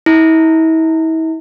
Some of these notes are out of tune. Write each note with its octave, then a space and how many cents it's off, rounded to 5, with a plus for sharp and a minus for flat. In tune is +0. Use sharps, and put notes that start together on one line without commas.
E4 -40